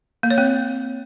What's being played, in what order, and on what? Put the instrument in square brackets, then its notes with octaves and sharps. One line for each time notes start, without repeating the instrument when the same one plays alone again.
[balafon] A#3
C#5
C4